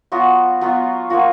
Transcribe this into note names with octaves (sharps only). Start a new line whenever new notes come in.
F#3 B3 F4 F#4
F#3 B3 F4
F3 A#3 F4 F#4